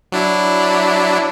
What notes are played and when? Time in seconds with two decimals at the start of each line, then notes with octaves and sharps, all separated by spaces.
0.12 F#3 D4 E4